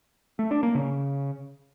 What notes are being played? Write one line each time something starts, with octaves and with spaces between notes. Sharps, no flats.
A3
D4
A#3
C#3